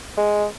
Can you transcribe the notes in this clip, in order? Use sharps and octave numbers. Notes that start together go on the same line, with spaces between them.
G#3